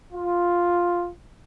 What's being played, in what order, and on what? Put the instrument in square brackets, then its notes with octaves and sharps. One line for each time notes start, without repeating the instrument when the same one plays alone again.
[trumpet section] F4